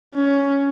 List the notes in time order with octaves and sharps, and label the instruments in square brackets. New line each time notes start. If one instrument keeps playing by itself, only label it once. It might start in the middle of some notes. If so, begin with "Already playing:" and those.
[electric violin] C#4